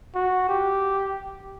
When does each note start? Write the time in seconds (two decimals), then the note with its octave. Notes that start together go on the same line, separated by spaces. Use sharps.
0.15 F#4
0.49 G4